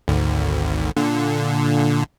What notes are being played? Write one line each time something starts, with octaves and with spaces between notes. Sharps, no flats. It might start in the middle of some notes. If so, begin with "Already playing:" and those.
G#1 D2
A#2 D3